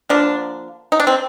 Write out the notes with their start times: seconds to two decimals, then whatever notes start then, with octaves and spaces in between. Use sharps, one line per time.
0.09 D3 F3 A#3 D4
0.92 D#4
1.00 D4
1.07 C4